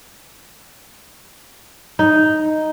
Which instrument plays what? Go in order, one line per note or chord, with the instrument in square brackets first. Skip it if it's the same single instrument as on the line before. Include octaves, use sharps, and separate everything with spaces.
[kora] D#4